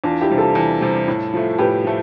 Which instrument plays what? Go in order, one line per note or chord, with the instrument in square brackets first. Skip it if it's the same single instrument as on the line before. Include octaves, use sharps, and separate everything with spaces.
[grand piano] E2 [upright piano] D4 F4
[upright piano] E4 G4
[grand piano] C3 G3
[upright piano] F4 A4
[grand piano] E2
C3 G3
A2
F3 A3
[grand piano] A2 [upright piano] G4 B4
[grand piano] F3 A3